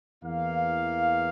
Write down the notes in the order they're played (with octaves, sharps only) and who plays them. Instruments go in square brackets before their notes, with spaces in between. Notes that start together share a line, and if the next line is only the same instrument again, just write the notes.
[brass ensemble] E2 E3 A#3 F5